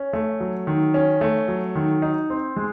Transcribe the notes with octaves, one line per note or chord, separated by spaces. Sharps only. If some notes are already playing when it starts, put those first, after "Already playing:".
Already playing: C#4
A3
F#3
D#3
C#4
A3
F#3
D#3
D#4
C4
G#3